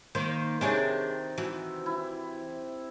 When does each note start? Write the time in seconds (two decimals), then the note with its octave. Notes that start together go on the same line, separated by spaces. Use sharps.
0.15 D#3 A#3 C5
0.61 C3 D#3 D4 G#4 C#5 D5
1.38 E3 F#4
1.86 E4